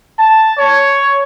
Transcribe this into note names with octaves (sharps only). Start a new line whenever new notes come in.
A5
C#5